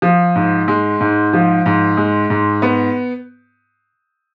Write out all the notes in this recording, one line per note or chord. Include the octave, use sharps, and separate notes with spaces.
F3
G#2
G#3
G#2
F3
G#2
G#3
G#2
B3